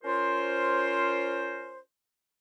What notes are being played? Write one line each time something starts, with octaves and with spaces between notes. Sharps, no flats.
C#4 F4 A#4 C5